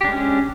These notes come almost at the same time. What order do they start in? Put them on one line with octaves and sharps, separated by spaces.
G4 D4 G#3 C#4